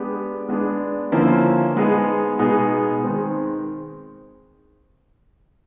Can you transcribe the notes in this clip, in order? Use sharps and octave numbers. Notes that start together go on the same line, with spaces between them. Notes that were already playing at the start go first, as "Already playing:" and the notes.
Already playing: G#3 B3 D4 G4
G#3 B3 D4
D3 F3 A#3 C#4 E4
G#3 B3 D#4 G#4
B2 G#3 B3 D#4 G#4
D#3 G#3 C4